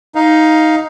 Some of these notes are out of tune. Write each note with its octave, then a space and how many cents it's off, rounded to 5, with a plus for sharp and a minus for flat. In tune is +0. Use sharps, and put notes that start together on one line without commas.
D#4 +10 F5 +0